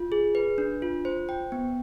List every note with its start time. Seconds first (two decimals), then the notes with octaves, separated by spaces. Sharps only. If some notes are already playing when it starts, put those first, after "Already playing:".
Already playing: F4
0.12 G#4
0.35 B4
0.58 D4
0.82 F4
1.05 C5
1.29 G5
1.52 B3